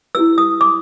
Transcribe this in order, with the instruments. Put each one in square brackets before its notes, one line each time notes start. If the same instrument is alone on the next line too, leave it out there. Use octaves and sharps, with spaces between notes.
[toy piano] E4 G4 B4 E6
D#6
D6